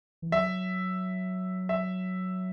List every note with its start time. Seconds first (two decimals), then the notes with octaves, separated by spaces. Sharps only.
0.22 E3
0.32 F#3 E5
1.69 E5